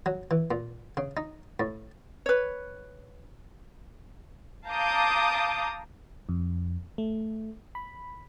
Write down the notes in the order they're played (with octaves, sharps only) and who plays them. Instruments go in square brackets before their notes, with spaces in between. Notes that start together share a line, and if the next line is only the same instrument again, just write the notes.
[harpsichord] F#3
E3
A#2
C#3
D#4
A2
[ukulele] B4 C#5
[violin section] F5 A5 A#5 D6 D#6 G6
[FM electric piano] F2
A3
B5